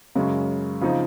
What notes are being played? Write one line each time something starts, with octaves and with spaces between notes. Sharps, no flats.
F#2 C#3 G#3 C#4
C#3 F3 C4 D#4